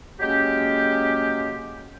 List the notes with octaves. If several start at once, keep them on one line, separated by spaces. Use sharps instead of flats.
F#3 G#3 A#3 C#4 G4